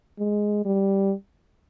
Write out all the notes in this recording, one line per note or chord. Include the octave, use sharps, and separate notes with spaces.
G#3
G3